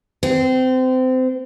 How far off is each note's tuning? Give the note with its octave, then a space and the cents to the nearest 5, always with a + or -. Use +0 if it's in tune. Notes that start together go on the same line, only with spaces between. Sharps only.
C4 -25